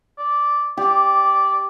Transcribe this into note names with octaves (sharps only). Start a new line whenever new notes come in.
D5
G4 D5